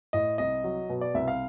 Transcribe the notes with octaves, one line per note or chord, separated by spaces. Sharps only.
A2 D#5
C2 D#5
F#3
B2
D5
C2 E5
F5